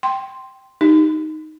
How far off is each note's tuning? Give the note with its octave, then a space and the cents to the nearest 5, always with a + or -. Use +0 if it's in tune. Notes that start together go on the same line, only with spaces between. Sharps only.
G5 +0 C6 +0
D#4 +0 G4 +0